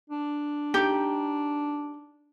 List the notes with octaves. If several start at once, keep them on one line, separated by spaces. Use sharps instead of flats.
D4
D#4 G4